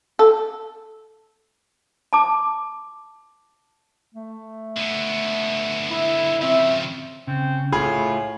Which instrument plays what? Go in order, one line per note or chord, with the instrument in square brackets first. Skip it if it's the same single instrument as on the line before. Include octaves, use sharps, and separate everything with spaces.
[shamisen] A4
[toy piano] A5 D6
[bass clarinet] A3
[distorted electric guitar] D3 B3
[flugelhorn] E4
[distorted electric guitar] C#3 F3 [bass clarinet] C4 [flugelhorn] E5
[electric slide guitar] C#3 [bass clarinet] C4
[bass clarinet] A2 [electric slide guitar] A3 F4 [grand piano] G#4 [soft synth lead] B5